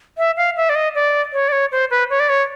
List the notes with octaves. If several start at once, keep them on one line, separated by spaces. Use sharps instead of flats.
E5
F5
E5
D5
D#5
D5
C#5
D5
C#5
C5
B4
C#5
D5
C#5